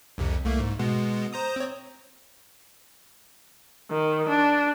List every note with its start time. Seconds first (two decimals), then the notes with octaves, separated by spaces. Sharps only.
0.18 C2 F2 C3
0.44 C2 A3 A#3
0.60 G#2
0.79 B2 G#3 B3
1.33 C5 A#5 D#6
1.56 C4 C#5
3.91 D#3
4.29 D4